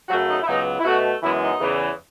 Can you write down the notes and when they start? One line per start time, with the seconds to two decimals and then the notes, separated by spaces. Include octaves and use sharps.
0.09 F#2 C#3 F#3 A3 F#4
0.28 D#4
0.43 E4
0.47 C#2 C#3 F#3 B3 D#4
0.80 E4
0.85 B2 A3 F#4
1.23 F#2 E3 G#3 B3 E4
1.41 D#4
1.61 E2 C#3 E3